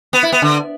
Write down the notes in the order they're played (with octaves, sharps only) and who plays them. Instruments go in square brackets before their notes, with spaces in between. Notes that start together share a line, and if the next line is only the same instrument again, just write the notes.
[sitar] B3
E4
B3
D3